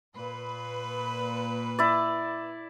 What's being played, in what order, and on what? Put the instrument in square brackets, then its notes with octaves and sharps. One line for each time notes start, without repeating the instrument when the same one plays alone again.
[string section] A#2 B4
[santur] E4 D5